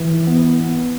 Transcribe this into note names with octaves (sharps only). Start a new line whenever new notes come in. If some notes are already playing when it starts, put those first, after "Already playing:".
Already playing: E3
B3
B3